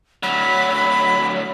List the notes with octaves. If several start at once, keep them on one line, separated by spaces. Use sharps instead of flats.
D2 F#3 B5